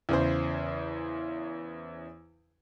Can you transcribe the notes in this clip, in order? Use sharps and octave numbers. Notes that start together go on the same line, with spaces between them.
E2 C#3 C5